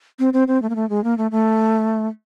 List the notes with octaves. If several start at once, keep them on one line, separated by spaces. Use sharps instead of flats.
C4
C4
C4
A3
A#3
A3
G#3
A#3
A3
A3